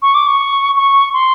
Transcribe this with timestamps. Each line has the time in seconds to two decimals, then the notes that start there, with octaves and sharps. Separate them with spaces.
0.02 C#6
0.14 D6
0.27 C#6
0.76 C#6
1.13 C6